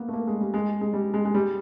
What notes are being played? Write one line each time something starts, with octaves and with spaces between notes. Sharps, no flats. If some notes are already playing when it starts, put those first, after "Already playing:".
Already playing: A#3 B3
A3
A#3
G#3
G3
G#3
G#3
G3
G#3
G#3
G3